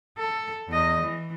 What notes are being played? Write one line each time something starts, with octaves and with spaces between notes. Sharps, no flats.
A4
E2 D#5
E3